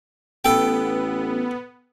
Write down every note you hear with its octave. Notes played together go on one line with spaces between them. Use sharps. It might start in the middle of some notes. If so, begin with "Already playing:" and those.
A1 B3 A4 G5